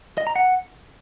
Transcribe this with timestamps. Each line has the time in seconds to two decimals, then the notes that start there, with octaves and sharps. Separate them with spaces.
0.18 D#5
0.27 A#5
0.36 F#5